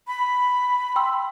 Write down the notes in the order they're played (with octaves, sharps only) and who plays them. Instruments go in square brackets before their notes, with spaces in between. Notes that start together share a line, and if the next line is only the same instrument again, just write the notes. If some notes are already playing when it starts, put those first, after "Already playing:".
[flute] B5
[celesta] G5 C6 E6